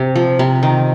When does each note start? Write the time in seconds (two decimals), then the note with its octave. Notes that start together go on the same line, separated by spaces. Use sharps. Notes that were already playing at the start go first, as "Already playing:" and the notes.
Already playing: C3
0.16 F3
0.39 C3
0.63 D#3